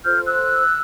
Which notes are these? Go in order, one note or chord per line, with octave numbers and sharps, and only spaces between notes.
F4 A4 C5 F6 G6
E6 F#6